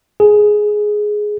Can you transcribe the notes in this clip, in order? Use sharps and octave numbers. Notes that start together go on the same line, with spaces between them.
G#4